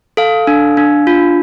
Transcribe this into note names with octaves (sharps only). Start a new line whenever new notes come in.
A4 F5
D4
D4
F4